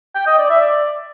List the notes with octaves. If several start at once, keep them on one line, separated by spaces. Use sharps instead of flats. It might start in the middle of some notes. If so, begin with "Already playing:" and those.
G5
D#5
D5
E5
D5